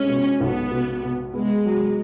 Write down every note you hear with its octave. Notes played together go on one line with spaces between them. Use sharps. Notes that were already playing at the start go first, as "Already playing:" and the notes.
Already playing: G#3 C#4
B2
B1 B3
B2
B2
G#3 B3
F#3